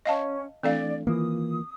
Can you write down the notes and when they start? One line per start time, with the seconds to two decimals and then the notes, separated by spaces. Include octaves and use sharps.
0.06 C#4 D#5 F5 A5
0.63 E3 A3 C4 D4 A4 D5 F5
1.07 D#3 E3 A#3 F4 D#6